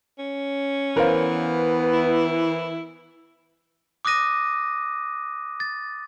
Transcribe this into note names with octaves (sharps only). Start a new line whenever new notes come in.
C#4
E3 B3 A#4 C5 F5
E4
D6 D#6 F#6 A#6 D#7
A6